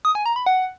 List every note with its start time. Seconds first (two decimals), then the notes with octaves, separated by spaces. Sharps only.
0.05 D#6
0.15 G#5
0.26 A#5
0.36 B5
0.46 F#5